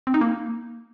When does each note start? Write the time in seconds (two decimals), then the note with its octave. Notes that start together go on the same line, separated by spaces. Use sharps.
0.07 C4
0.14 D#4
0.21 A#3